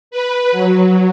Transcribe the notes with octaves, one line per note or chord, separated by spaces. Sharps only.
B4
F#3